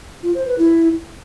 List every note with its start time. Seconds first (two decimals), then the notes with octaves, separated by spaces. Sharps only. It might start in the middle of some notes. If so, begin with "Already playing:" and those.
0.23 F4
0.35 C5
0.46 B4
0.58 E4